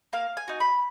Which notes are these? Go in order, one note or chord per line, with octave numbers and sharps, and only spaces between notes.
A#3 F5
G#5
D#4 F#4
B5